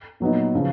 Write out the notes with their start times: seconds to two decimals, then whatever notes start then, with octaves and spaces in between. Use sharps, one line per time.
0.20 A#2 F#3 B3 D#4
0.55 C#3 F3